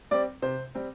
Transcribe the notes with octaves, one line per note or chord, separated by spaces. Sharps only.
G3 C4 D5
C3 C5
G3 C4